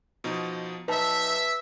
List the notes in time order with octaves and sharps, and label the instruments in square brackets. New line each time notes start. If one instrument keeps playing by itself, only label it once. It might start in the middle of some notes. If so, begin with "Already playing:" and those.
[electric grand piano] B2 F3 D#4
[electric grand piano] B1 D#4 [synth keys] B4 A5 [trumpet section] E5